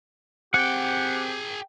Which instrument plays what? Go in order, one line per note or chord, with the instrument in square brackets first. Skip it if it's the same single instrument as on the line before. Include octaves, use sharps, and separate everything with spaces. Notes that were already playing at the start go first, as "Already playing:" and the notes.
[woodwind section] C4 G4 [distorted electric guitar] G#4 G5 [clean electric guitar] F#5